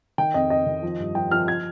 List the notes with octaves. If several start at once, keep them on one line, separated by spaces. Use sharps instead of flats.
D#3 G5
F2 D#5
F2 D#5
D#3
F3
G2
F3 G5
F3 F6
G#6